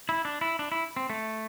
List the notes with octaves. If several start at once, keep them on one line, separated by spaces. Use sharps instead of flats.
E4
D4
E4
D4
E4
C4
A3